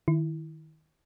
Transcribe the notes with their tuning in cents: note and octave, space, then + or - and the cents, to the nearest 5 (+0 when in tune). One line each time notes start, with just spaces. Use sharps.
D#3 +0 E4 +0